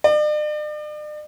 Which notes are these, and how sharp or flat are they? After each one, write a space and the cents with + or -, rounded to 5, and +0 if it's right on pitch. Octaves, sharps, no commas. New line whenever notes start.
D5 +45